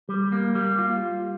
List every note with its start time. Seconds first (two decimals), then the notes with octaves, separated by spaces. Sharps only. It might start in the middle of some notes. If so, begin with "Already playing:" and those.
0.09 G3
0.32 A#3
0.55 G3
0.79 F4